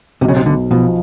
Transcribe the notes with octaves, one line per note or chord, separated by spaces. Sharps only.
B1 C3
C#3
C3
B1 D3
B2 F3